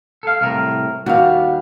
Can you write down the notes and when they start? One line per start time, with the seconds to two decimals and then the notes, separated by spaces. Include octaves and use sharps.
0.23 A4 F5
0.41 C2 A2 A#4
1.06 D#2 G3 D4 F#4 F5